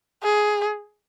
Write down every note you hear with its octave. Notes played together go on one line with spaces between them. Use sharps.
G#4